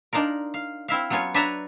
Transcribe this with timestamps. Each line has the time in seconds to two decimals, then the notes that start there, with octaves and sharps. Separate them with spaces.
0.13 D4 D#4 F4 A#4
0.54 F5
0.88 C4 E4 E5 F5
1.10 F#3 B3 C#4 F4 C#5
1.34 D4 B4 C#5 E5 A5 A#5